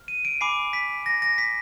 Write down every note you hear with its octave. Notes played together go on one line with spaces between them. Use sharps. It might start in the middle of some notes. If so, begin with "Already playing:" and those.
Already playing: F6
D#7
D7
G#5 B5 D6 C7
B6
A#6
A#6
B6